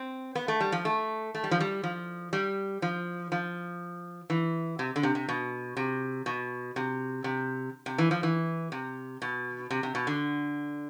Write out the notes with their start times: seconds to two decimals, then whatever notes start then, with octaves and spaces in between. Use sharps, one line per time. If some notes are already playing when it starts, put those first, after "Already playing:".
Already playing: C4
0.35 B3
0.48 A3
0.60 G3
0.72 F3
0.85 A3
1.35 A3
1.44 G3
1.51 F3
1.60 G3
1.84 F3
2.33 G3
2.82 F3
3.32 F3
4.30 E3
4.79 C3
4.96 D3
5.03 C3
5.15 C3
5.29 B2
5.77 C3
6.26 B2
6.76 C3
7.24 C3
7.86 C3
7.98 E3
8.11 F3
8.23 E3
8.72 C3
9.22 B2
9.71 C3
9.83 C3
9.95 B2
10.07 D3